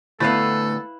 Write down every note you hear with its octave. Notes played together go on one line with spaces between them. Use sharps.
D2 A2 A3 B3 E4 A4 B4 F5